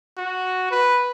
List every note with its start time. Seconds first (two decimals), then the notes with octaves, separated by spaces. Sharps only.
0.18 F#4
0.71 B4